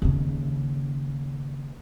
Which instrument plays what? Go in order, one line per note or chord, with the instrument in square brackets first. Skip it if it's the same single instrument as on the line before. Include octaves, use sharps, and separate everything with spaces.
[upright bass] D#2 C#3